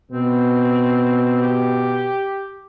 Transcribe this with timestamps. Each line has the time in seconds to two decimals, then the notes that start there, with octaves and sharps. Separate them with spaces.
0.12 B2 C4
1.42 G4